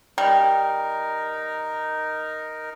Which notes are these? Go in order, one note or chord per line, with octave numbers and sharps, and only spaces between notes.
G3 D#4 A#4